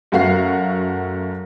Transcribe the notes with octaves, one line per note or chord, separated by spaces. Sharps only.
F#2 A3 F#4 F5 C7